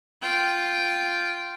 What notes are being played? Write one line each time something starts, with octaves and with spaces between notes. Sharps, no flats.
F4 G5